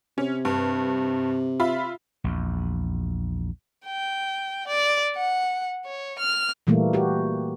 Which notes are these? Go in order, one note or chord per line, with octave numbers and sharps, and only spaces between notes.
C3 C#4
G2
F4 E5 B5
A#1 E2
G5
D5
F#5
C#5
F6
A#2 E3 G3 A3 A#3
F#4 G4